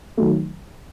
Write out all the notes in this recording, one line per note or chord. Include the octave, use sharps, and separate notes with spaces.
D#3 F#3 A3